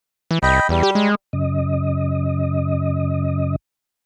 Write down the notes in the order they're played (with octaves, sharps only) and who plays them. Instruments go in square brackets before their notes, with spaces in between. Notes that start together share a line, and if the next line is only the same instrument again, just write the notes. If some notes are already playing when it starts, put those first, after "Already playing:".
[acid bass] E3
[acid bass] C2 [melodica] D#5 G5 B5
[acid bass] E2 [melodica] G3
[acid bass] G4
G#3
[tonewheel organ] F#2 C#3 D#5